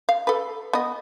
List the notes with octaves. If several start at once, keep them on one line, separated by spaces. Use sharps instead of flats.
F5
A4 B4
B3 D#5